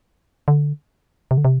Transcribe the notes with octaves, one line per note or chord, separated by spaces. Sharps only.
D3
C3
D3
C3